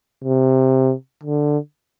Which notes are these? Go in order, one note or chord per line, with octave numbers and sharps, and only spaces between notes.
C3
D3